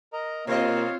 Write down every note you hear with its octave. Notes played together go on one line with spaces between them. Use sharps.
A#4 D#5 A#5
B2 A#3 C4 F4 C#5 D#5 F5